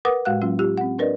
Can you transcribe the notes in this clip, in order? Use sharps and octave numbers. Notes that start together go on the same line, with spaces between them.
A#4 B4 F#5 D6 D#6
A2 G#3 F#4 F5 F#5 F#6
F#3 A#3 C#4 F4
F4 G4
C4 F#5
D4 A#4 B4 D5 D#5